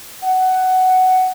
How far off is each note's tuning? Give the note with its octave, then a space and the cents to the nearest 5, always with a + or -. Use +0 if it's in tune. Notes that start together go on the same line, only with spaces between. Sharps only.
F#5 +10